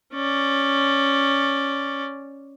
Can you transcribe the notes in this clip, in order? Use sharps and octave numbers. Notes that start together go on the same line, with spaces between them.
C#4 D5